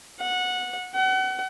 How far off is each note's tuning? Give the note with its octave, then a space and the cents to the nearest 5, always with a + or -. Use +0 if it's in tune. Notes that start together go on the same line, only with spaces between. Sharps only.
F#5 -20
F#5 +35